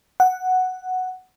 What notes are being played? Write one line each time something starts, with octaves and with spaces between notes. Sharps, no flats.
F#5